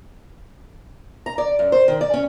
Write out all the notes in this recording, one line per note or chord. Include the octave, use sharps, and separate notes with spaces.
A#5
D5
F#2
C5
D#3
D5
C#4